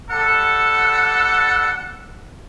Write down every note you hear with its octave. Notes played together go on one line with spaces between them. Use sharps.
G3 A4 F#5